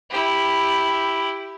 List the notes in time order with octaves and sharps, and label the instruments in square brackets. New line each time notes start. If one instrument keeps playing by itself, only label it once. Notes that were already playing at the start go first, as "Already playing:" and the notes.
[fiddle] E4 G4